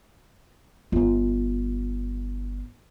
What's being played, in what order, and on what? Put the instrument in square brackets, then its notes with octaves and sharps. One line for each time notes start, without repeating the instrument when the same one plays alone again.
[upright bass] G1 F4